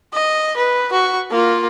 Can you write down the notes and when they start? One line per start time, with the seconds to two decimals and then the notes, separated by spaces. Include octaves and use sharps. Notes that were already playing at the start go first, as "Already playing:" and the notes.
0.13 D#5
0.57 B4
0.92 F#4 C#6
1.31 A#3 F4